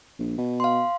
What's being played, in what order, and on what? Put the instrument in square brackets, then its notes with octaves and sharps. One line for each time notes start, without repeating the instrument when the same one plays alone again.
[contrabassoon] A#1
B2
[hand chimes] F5 C6